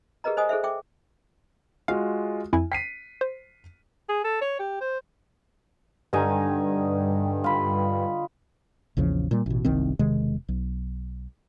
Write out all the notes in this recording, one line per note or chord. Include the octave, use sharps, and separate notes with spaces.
G4 G#4 A#4 B4 D#5 A#5
C5 D#5 G#5 D#6
G#4 A4 C5 E5
E5 G5 D6
G#3 F4 F#4 F5
F2 E4 G#5
G5 B6 C7 D#7
C5
G#4
A4
C#5
G4
C5
G2 D3 D#4 G#5
F4 B5
A#1 E2 C#3 F3
A#2 G3
A1 B2
F#1 C2 D#3 C4
E1 C3 D#3 G#3
B1